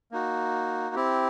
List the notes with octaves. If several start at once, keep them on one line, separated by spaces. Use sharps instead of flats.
A#3 D#4 F#4
C4 E4 G4